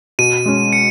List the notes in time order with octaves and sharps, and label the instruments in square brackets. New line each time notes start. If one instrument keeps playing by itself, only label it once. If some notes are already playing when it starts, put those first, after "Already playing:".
[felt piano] B2 [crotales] D#7
[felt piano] G#3 C#4
[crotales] C#7